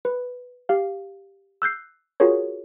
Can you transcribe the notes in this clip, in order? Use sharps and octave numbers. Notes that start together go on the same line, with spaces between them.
B4
G4 F5
E6 F#6 G6 C7
F4 F#4 G#4 A#4 C#5